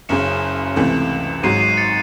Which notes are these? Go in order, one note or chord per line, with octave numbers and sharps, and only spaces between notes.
F#1 F#2 C#3 C#7 E7
C#2 C3 E3 A3
G#1 G#2 F#3 C7 D#7
C7 D#7
A6 C#7